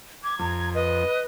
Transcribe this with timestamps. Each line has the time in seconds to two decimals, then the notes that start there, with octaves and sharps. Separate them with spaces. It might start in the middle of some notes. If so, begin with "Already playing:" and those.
0.24 D6 G#6
0.39 F2 A#5
0.74 B4 D#5